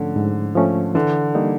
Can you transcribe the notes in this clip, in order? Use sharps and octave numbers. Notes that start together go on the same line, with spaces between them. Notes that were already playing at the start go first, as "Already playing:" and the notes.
Already playing: G#2 D3 F3 A3 C#4
G#2
F3 A3 C#4
D3 E3
G3 A#3 D#4